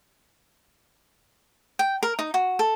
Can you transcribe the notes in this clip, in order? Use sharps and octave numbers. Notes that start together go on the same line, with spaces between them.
G5
A#4
D#4
F#4
A4